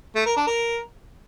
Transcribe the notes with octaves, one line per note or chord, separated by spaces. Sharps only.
A3
A#4
D4
A#4